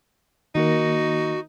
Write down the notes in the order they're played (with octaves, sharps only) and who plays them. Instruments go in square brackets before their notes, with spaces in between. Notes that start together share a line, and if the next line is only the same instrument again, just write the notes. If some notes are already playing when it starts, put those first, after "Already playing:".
[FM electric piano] D#3 A#3 A#4 [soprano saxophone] D#4 [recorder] F#4